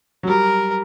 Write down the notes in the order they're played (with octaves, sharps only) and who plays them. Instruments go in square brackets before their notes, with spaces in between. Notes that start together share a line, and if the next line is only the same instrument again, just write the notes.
[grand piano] F#3
[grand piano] G3 [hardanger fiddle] A#4